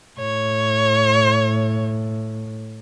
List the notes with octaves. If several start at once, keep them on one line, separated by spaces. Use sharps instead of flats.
A2 C#5